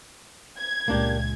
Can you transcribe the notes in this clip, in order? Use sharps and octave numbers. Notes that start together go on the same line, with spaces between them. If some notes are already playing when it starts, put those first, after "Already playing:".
G#6
C#2 A#2 G#3 A#3 D4 G4